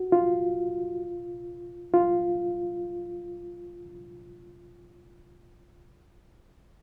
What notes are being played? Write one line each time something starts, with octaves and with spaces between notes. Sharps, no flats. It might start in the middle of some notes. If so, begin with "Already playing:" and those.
Already playing: F#4
F4
F4